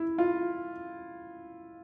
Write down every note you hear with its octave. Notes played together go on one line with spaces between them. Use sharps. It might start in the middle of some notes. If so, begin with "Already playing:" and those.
Already playing: E4
F4